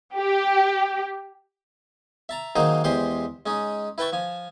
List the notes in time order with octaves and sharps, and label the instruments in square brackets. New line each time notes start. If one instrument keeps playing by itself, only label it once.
[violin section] G4
[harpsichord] E5 A5 A#5
D#3 F#3 A#3 D#4 G#4 C5
E2 G#3 G4 C5 C6 D#6
G#3 C#4 D#4
E4 B4 G5 A5 C#6
F3 G#5